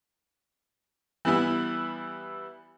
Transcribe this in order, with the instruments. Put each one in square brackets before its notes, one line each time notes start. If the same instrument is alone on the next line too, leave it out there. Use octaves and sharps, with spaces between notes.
[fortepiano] E3 G3 B3 E4